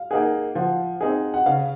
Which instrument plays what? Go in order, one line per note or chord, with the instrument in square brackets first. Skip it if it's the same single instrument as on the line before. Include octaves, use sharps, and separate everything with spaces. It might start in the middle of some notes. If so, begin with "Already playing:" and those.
Already playing: [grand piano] F5
[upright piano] A#3 D#4 G#4 [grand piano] F#5
[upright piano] F3 [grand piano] F#5
[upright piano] C4 D#4 G#4
[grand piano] F#5
[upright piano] C#3 [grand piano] F5